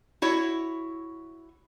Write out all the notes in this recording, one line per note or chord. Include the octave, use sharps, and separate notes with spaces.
E4 F#4 C#5